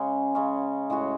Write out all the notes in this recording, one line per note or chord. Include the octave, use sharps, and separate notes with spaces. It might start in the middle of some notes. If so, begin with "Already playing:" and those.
Already playing: C#3 G#3 C#4
C#3 G#3 C#4
A2 G#3 C#4 F#4